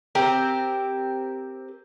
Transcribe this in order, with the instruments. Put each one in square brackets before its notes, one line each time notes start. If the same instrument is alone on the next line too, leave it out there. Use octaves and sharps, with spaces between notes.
[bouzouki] C4 G4 A#4